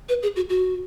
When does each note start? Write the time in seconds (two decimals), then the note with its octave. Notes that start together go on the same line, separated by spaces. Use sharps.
0.09 B4
0.23 G#4
0.36 F#4
0.50 F#4